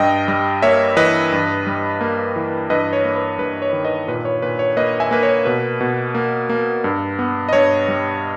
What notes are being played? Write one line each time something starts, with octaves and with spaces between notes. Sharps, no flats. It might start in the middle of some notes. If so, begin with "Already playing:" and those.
Already playing: G2 D#5 G5
G3
A#3 C#5 E5
E3 B4 D#5
G2
G3
A#3
E3
G2 B4 D#5
C#5
A#3
B4
G2 B4
C#5
D#3
B4 D#5
A#2 B4
C#5
A#2 B4
C#5
A#3 B4 D#5
E5 G#5
A#3 B4
C#5
B2 B4
B2
A#3
A#3
G2
B3
D#5
G2 C#5
G3